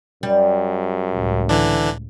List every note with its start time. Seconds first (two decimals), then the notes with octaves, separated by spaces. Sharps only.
0.23 F#2 G3
1.11 C#2 A2
1.49 D3 E3 D4